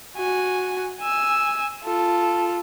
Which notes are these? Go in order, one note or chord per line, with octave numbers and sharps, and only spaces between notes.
F#4 G#5
G#5 E6
F4 A4